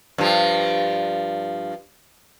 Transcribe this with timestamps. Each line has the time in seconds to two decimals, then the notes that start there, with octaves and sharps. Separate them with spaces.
0.18 G2 F3